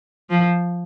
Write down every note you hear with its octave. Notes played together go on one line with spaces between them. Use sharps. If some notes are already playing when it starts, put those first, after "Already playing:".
F3